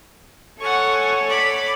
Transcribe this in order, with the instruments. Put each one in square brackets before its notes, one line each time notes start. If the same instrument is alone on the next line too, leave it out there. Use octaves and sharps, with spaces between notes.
[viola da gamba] A4 C#5 [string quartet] F#5 G#5 C#6
[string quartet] D5 B5